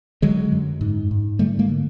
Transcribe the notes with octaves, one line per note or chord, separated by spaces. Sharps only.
D3 F#3 G#3
F#2
G#2
G#2
D3 G3 A3
G#3 A#3
D3